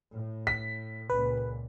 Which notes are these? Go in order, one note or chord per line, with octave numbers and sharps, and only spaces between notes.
A2
B6
C#2 A#2 B4